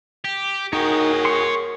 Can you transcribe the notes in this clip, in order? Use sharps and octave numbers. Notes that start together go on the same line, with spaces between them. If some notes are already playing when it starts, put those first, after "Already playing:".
G4
D#4 F#4 G#4 A#4 C#5 G5
C6 C#6